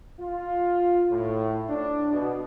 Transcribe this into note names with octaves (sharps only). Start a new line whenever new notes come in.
F4
A2
D4
B2